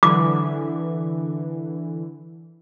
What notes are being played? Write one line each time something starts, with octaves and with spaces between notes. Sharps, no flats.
D3 E3 D6